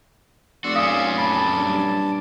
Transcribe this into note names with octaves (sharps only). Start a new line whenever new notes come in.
F1 F#4 D5 C6 E6
F#2 A#2 C#4 F5 D#6
A5 B5 D6
G2